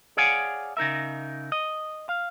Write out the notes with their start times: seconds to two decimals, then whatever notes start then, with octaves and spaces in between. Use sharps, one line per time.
0.17 G#4 C#5 D5 F5 F#5 G#5
0.77 C#3 D#4 A#4 E5
1.52 D#5
2.09 F5